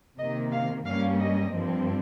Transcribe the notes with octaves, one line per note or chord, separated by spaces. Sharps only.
C3 D#3 A#3 D#5
F5
G2 G3 A#3 C#4 F5
D#5
G2 F3 C4